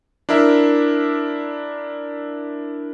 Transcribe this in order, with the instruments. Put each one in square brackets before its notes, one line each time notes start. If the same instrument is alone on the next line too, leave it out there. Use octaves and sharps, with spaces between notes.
[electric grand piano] D4 E4 A#4 E5